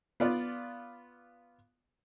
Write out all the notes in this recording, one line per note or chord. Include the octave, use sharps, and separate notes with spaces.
B3 F4 D5